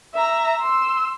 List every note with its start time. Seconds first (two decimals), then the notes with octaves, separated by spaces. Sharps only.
0.14 E5 A#5
0.60 C6 E6